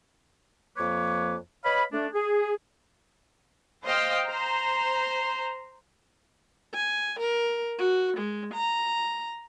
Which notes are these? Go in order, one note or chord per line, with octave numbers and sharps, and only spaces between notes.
F2 F3 A#3 B4 C#5 D6
B4 C#5 D#5 F5 B5
A3 D4
G#4
C5 D#5 F5 G5
C5 A#5
G#5
A#4
F#4
G#3
A#5